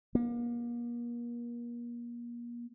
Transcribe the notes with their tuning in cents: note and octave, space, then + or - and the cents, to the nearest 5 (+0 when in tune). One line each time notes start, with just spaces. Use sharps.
A#3 +35